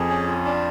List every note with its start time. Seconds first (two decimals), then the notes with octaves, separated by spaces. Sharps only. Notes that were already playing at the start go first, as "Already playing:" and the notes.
Already playing: F2 G#4
0.09 C#4
0.27 F4
0.45 D4